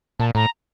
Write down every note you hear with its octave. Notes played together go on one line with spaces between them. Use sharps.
A#2 A5
A2 A#5